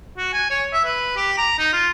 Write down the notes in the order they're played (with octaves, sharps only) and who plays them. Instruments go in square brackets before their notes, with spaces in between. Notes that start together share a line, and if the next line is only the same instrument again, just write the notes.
[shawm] F#4
G#5
C#5
E5
B4
G4
A#5
D#4
F4